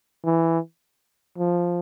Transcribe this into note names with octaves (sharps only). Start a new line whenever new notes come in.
E3
F3